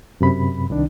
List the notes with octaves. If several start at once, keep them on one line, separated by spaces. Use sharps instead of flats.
F#2 C3 B5
C2 D#3 D4